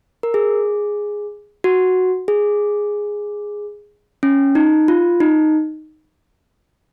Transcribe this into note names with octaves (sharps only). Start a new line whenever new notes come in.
A#4
G#4
F#4
G#4
C#4
D#4
F4
D#4